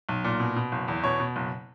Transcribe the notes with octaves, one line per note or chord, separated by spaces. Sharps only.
B1
A#2
B2
B2
F#1
E2
B2 C#5
B2
F#1